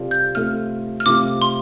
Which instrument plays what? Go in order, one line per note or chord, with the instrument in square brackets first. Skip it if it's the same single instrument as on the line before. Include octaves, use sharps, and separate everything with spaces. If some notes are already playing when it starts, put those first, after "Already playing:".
Already playing: [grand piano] C3 G3 F4 A4 D5
[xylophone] G6
[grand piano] C3 A3 F4 A4 [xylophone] F6
[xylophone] F6
[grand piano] C3 A3 F4 [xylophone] D6
[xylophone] C6